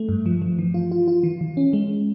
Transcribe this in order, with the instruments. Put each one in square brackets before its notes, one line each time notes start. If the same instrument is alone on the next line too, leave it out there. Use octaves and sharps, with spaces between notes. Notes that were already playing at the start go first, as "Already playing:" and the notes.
Already playing: [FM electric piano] A3
G2
F3
F3
E3
F4
F4
F4
E3
E3
C#4
G#3